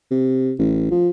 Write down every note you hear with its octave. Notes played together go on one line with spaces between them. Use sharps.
C3
A1
F3